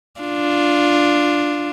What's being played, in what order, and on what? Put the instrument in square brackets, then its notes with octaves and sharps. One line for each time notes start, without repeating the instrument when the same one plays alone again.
[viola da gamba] D4 F4